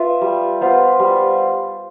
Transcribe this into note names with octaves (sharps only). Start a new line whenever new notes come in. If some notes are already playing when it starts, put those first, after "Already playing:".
Already playing: F4 B4 E5
G3
B3 F4 C5
G3